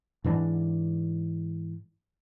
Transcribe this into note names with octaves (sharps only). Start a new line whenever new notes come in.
G#2 E3 D4